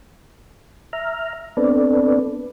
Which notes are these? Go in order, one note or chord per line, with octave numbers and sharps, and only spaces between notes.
E5 A#5 F6
B3 C4 D4 A4 B4 D5